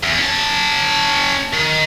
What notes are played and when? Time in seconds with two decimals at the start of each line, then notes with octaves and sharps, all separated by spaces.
0.03 E2
0.18 C#4 A5
1.54 D#3